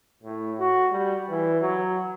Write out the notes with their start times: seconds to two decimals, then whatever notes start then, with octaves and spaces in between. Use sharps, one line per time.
0.23 A2
0.59 F#4
0.91 G3
1.29 E3
1.61 F#3